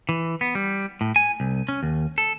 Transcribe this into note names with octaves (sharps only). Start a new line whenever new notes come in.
E3
B3
G3
A2
G#5
C2
C#4
D#2
A4